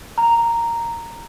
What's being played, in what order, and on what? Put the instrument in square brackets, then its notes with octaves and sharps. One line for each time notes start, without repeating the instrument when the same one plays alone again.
[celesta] A#5